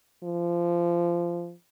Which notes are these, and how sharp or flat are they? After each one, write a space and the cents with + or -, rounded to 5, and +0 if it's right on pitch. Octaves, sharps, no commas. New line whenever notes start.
F3 -20